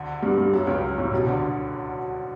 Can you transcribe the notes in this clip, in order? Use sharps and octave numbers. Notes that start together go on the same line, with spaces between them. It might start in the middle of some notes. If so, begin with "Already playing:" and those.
Already playing: D2 D3
G2 G3
G2 G3
F#2 F#3
C#2 C#3
A2
B2
D2 D3